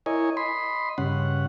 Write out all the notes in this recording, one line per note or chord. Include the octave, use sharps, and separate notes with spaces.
E4 A#4 C#5 D#5 G#5
D#5 B5 C6
G2 C#3 C#4 F#5